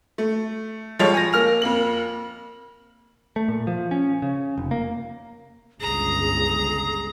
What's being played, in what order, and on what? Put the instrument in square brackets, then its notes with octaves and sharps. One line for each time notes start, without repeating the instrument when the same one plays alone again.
[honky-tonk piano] A3
F3 G3 G#3 A4 C#5 F7
G#5 A#6
A#3 F6 F7
F2 A#3 F#7
[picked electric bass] A3
A#2
F3
C#4
C#3
F1
A#3
[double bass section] G1 C#2 [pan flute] G#4 [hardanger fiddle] A#5